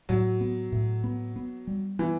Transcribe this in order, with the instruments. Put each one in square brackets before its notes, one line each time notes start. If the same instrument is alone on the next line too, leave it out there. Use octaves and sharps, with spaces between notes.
[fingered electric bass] A2 [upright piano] F#3
[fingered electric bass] B3
A2
B3
B3
G3
[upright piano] E3 [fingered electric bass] B3